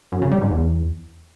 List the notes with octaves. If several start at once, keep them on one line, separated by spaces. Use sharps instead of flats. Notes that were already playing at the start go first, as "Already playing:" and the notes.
F#2
C#3
G3
G#2
E2